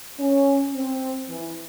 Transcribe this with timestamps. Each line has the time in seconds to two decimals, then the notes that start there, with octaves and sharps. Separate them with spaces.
0.19 C#4
0.74 C4
1.30 E3